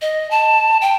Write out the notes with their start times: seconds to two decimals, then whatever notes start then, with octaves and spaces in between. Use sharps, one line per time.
0.02 D#5
0.31 A5
0.81 G5